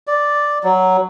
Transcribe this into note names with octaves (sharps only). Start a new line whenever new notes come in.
D5
F#3